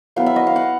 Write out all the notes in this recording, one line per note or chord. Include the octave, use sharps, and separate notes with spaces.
F#3 B3 E4 F5
E5
D#5
F5
F#5